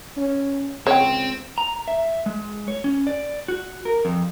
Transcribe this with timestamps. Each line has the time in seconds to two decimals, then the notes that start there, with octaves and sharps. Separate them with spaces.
0.17 C#4
0.87 C#2 C4 C#5 G5
1.58 A#5
1.88 E5
2.26 G#3
2.68 C#5
2.84 C#4
3.07 D5
3.48 F#4
3.85 A#4
4.05 F2